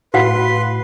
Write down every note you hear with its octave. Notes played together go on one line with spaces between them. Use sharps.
A2 F#4 B4 F5 F#5 C6